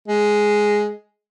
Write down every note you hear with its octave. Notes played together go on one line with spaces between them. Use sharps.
G#3